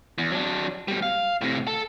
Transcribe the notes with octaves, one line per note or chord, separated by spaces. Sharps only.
E2
F#3 D4
B2 G3
F5
A2 C3
A4